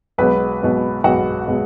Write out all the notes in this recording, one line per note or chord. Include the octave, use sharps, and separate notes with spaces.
B1 B2 G#3 B3 B4 B5
B1 B2 G#3 B3
B1 B2 G#3 B3 F#4 F#5
B2 G#3 B3